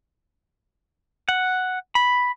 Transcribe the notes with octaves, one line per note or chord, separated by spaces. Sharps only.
F#5
B5